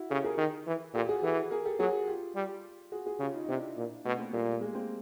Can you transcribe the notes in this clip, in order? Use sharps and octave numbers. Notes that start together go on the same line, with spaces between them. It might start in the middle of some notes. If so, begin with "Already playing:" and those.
Already playing: E4 F#4
C#3 G4 A4
G#4 A#4
D#3
E3
A#2 G4 A4
F#4 G#4
E3 G4 A4
G#4 A#4
G4 A4
F#3 F#4 G#4
F4 G4
G3
F#4 G#4
F#4 G#4
C#3 F4 G4
D#4 F4
D#4
C3 D4 E4
A#2
B2 A3 B3
A#3 C4
A#2 G3 A3
G#3 A#3
A#3 C4